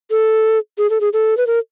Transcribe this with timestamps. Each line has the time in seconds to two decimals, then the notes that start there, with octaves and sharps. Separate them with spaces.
0.11 A4
0.78 G#4
0.90 A4
1.01 G#4
1.13 A4
1.37 B4
1.47 A#4